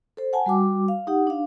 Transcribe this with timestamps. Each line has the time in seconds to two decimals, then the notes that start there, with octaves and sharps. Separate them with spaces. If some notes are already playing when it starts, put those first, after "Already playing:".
0.17 A4 C5
0.33 F#5 G#5 A5
0.46 G3 F#4 D6
0.88 F5
1.07 D#4 G4 F#5
1.27 D4 F5